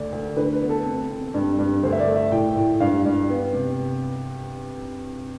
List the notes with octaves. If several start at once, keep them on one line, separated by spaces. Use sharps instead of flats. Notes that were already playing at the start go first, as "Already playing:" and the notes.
Already playing: D2 D5
D2
D3 B4
B4
B3
A4
C4
C4
G2
G2
D2 C5
E5
D5
A3
E5
A2 G5
A2
G2 F5
G2
B3
C3